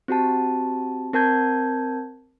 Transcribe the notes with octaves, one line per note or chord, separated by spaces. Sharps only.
C4 F#4 G4 A5
C4 A#4 A5 G6 G#6